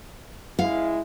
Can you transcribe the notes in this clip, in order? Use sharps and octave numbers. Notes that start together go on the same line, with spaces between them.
C#3 G#3 E4 F5